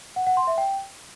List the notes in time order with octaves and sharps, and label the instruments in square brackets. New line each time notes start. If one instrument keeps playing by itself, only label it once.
[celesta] F#5
F#5
C6
E5
G5